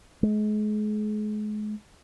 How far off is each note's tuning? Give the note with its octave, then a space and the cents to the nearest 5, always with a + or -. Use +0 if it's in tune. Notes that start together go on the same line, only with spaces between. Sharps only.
G#3 +35